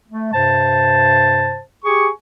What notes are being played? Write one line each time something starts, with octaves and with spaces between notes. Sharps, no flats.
A3
G2 C3 C5 A5
G4 G#4 G#5 C#6